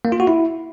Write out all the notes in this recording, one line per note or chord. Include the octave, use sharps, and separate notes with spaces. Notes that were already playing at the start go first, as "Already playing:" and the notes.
A#3
F4
F#4
E4